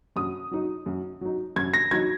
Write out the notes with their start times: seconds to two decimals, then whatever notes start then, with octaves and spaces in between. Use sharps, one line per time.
0.16 F#2 D#6
0.51 F#3 D#4
0.86 F#2
1.21 F#3 D#4
1.56 F#2 G#6
1.74 A#6
1.91 F#3 D#4 G#6